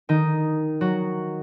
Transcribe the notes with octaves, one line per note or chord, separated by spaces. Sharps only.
D#3 D#4
F#3 F#4